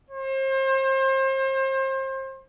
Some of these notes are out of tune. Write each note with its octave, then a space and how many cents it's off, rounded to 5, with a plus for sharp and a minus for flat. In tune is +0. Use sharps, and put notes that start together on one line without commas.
C5 +35